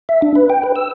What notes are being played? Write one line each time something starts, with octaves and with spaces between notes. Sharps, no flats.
E5
D4
B4
G5
B4
E6